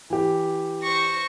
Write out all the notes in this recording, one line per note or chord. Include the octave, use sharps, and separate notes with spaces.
E3 G4
C5 C#6 A#6